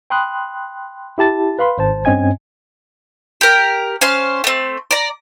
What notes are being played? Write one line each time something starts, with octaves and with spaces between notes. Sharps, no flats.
G5 B5 C6 D#6 F#6
E4 G4 A5 A6
B4 F5 B5 C6
G#1 C5 A5
G2 C4 C#4 D#5 G#5 G#6
G4 A#4
C#4 C5 F5
A3 C4
D5 A#5